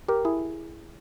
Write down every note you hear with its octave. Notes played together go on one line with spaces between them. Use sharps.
G4 A#4
E4 G#4